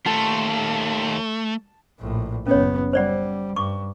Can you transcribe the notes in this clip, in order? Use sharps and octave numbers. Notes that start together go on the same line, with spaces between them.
D#2 A3 F4 A5
A#1 A2
F#1 B3 C#4 C#5
G3 C5 D5 F#5
G2 C#6 D6